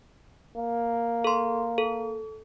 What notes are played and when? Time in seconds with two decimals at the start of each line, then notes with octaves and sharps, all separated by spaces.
0.57 A#3
1.24 A4 C6
1.78 A4